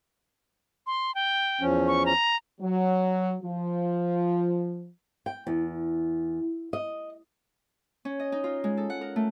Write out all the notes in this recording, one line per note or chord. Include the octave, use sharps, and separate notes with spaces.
C6
G5
E2 F3 C#4
C#6
A#5
F#3
F3
G5
E2
D#5
C#4
D#5
D#4
F4
G#3
A4
F#5
A#4
A3